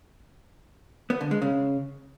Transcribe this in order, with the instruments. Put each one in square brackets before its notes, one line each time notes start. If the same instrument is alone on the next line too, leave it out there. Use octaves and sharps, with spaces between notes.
[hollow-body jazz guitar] B3
D3
G#3
C#3